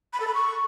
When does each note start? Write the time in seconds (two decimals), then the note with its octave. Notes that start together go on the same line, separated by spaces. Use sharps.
0.13 B5
0.20 A4
0.27 B5
0.35 C#6